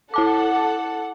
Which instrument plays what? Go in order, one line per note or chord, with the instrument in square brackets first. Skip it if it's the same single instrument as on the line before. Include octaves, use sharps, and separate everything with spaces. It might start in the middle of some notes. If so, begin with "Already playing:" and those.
[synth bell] E4 A5 D6 [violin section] A4 F#5